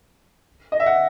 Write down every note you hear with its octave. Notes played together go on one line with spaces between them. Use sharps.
D#5
E5
F#5